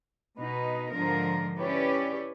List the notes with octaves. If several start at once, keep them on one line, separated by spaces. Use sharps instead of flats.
B2 D#4 B4
G#2 D3 F3 A#4
C#4 E4 G4 B4 C#5 D5